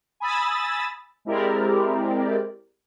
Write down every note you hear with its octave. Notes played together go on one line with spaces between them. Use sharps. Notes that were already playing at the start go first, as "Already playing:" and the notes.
G#5 B5 D#6 E6 A6
G#3 C4 E4 G4 A#4 D5